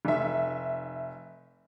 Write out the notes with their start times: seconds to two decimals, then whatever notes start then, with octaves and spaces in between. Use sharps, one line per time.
0.05 F1 E5